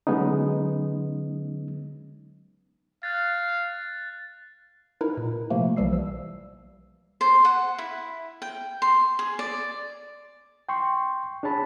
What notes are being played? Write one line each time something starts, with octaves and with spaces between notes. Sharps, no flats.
D3 F#3 G#3 B3 C#4 D#4
F5 F#6 G#6 A6
D#4 E4 A#4 B4
A#2
C3 F3 A3 A#3
B1 E3 F3 G3 E6 C7
E6
C5
F#5
E4
G5
C6
G#4
D5
G5 C6 C#6
D4 G#4 C#5 A5 B5